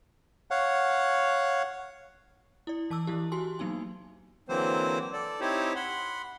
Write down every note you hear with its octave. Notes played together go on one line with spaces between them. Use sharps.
C#5 F5 F#5
E4 D5
E3 A5 D6 E6
E3 E4 G4
F#4 G4 G#5 C6
F#3 A#3 B3 D#4 G#5
D3 E3 F#3 A#3 C4 C5
A4 D5
C4 D#4 E4 G4 C5 C#5
F#5 B5 C6